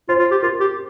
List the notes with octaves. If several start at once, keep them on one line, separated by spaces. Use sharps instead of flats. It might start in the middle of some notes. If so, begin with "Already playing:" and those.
F4 C5
F4
G4
F4 A#4
G4